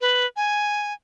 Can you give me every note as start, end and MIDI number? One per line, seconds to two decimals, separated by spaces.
0.01 0.26 71
0.37 0.93 80